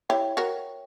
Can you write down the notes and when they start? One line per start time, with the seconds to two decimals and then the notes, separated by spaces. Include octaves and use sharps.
0.09 E4 G4 C#5 E5 G5
0.37 F#4 A#4